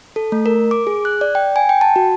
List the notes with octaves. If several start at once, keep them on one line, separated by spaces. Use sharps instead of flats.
A4
A3
A#4
D6
G#4
F#6
D5
G5
G#5
G5
A5
F#4